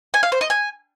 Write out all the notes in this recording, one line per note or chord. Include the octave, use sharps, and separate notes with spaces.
G#5
F5
C5
D#5
G#5